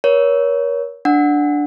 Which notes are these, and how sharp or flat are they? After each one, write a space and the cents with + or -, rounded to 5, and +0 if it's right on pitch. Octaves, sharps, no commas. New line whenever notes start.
A#4 +40 C#5 +20
D4 +0 F#5 -10